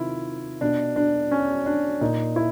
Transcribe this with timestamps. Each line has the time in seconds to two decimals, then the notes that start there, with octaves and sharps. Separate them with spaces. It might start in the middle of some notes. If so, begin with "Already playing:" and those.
Already playing: C3 D#3 E4 F4
0.61 B2 D4
0.96 D4
1.31 C#4
1.66 D4
2.01 A#2 D#4
2.36 E4